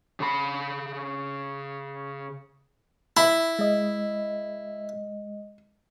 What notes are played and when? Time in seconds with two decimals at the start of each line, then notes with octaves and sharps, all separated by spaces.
0.20 C#3 B5
3.17 E4 B5
3.59 G#3 D#5